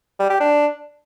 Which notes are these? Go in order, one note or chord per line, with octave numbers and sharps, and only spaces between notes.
G3
G4
D4